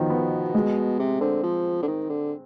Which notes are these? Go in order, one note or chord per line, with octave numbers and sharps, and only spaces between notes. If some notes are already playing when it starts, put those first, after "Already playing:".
Already playing: B2 D#3 F3
B3
G#3
C3
D3 C4
F3
D3
D#3
D3